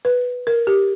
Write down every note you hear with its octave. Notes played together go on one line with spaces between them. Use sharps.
B4
A#4
G4